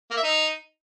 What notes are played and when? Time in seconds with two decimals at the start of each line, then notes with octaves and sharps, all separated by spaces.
0.11 A#3
0.17 E5
0.24 D#4